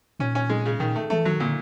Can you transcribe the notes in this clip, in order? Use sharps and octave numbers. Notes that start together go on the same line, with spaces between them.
A#2 C#4
C#4
G#3
C#3
A#2 D#3
A3
E3 A3
D#3 F#3
A#2 D3